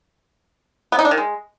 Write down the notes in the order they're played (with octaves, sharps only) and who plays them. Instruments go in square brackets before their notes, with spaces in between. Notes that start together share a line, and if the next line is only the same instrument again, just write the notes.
[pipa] B3
D#4
D4
D#3
G#3